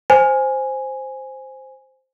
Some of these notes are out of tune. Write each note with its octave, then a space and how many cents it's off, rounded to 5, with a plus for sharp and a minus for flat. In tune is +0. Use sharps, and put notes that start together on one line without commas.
C5 +0 G#5 +0